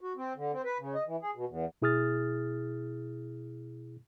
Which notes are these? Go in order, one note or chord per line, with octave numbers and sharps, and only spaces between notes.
F#4
C4
D3
C4
B4
C#3
D#5
E3
G#4
B2
E2
B2 E4 G#4 D#6 F6 A6